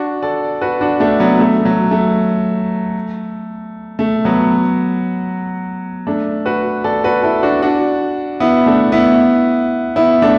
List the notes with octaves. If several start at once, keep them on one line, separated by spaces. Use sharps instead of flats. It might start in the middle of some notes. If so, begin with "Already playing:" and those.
Already playing: D4 F#4
A4 D5
F#4 B4
D4 F#4
A3 D4
F#3 B3
A3
F#3
A3
A3
F#3 B3
A3 D4
F#4 B4
A4 D5
F#4 B4
E4 A4
D4 F#4
D4 F#4
B3 E4
A3 D4
B3 E4
B3 E4
A3 D4